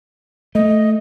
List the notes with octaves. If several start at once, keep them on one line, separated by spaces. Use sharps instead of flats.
A3 D#5